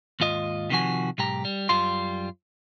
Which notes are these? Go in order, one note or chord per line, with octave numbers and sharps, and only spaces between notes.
D#2 G#2 F4 D#5
C3 D#3 F3 F#4 G#5
B1 G#2 G4 A#5
G3
F#2 G3 F4 C6